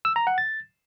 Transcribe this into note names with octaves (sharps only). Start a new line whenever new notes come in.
E6
A#5
F#5
A6